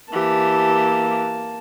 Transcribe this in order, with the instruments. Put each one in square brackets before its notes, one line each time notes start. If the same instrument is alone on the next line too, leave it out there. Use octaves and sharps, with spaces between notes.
[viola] E3 G4 [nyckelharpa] A#3 A5